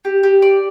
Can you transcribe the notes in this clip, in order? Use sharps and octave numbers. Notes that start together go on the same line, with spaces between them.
G4
G4
D5